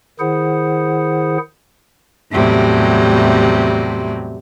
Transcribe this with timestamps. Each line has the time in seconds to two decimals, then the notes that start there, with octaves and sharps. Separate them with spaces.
0.20 D#3 E4 G#4 C5 F#5
2.31 E2 A2 C3 F#3 G3